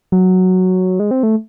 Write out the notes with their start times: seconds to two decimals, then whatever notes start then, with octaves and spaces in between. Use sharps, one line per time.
0.12 F#3
1.00 G#3
1.11 C4
1.23 A3